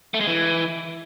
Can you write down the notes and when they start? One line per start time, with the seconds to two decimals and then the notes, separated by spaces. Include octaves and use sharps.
0.14 A3
0.21 G#3
0.27 E3